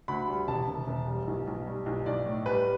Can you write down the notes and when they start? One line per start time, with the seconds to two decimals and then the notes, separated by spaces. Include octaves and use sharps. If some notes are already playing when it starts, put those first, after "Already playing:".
0.08 D2 B5
0.28 G3
0.48 E1 A5
0.68 E1
0.87 E1
1.07 G3
1.27 B1
1.47 B1
1.67 G3
1.86 B1
2.06 B1 D5
2.26 A2
2.46 G3 B4